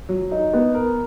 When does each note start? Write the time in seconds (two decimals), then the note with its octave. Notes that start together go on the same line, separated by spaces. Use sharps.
0.09 F#3
0.31 D#4
0.53 B3
0.74 A#4